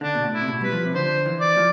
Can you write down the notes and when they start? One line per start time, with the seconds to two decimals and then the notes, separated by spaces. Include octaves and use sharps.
0.01 D3 D4
0.15 B2
0.25 A2
0.33 E4
0.41 C3
0.48 B2
0.61 G3 B4
0.72 F3
0.85 C3
0.94 D3 C5
1.26 E3
1.41 D5
1.57 F3